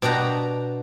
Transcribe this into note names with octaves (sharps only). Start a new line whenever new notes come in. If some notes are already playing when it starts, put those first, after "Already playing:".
B2 D4 G4 A#5